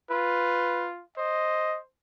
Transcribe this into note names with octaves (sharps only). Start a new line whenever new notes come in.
F4 B4
C5 D#5